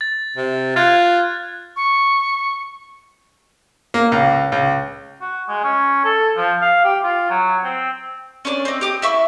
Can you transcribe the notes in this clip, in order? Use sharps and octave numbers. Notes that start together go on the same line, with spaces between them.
A6
C3
F4 F#6 G#6 A6
C#6
A#3
C#2
C#2
F#4
G#3
C#4
A4
F3
F5
G4
F4
F#3
C4
C#4 D4 C#5 D5
C4 D#4
G4 D6 D#6
E4 E5 C#6